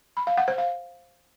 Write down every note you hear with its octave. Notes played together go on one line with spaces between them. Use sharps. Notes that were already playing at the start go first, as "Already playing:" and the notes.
B5
F5
F#5
C5
F5